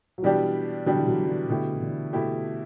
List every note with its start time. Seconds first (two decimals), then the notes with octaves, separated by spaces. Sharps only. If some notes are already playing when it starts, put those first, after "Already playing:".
0.18 F#3
0.22 B2 E3 G3 D4 G4
0.86 B2 D3 F#3 G3 D4 G4
0.98 E3
1.08 D3 F#3
1.23 F#3
1.29 E3
1.49 B2 D3 A3 E4 G4
1.74 E3
1.81 D3
2.13 B2 A3 E4 G4